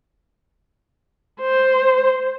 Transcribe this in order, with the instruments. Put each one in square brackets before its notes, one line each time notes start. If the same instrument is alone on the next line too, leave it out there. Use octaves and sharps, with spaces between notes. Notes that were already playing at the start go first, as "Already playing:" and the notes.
[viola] C5